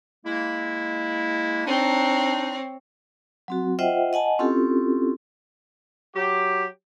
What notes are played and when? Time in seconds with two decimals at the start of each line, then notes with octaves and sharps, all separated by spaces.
0.25 G#3 A#3 E4
1.66 C4 D4 D#4 C#5
3.48 F#3 C4 F#4
3.79 F4 C5 D#5 E5 F#5 G5
4.13 D#5 F#5 G#5 A5
4.39 C4 C#4 E4 F4 G4 A4
6.15 F#3 G4